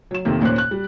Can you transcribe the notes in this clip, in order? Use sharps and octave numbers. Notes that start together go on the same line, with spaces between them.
F#3 E7
F2 C3 D#3 A#3
D#2 A#2 C#4 C5 F#6
F#6
G3